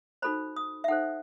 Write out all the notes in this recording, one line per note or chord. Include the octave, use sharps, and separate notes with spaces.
D#4 F#4 A4 C5 B5
D#6
E5
D#4 A4 C5 F#5